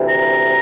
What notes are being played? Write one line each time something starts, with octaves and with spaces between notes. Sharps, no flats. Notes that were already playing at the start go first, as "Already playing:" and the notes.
Already playing: D2 C3 E3
A#5